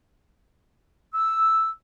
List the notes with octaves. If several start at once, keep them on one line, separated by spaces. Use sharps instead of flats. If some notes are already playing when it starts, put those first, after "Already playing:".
E6